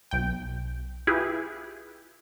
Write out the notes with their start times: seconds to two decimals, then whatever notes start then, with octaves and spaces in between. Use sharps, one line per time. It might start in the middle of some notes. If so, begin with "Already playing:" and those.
0.11 B1 G5
1.07 E4 F4 G4 G#4 B4